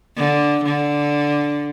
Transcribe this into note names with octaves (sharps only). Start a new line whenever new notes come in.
D3
D3